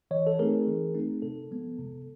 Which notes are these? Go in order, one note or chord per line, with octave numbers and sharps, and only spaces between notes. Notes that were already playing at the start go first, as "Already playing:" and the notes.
E3 C#5 D#5
A4
A3 C4 D#4 G#4 A#4
E3
A3 C4 D#4
C3 A4
F3 G#3 B3
C3